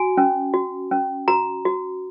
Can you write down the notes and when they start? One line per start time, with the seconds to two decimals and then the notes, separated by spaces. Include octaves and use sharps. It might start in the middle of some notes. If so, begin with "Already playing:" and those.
Already playing: F#4 G#5
0.17 C#4
0.54 F#4
0.91 C#4
1.28 F#4 A#5
1.65 F#4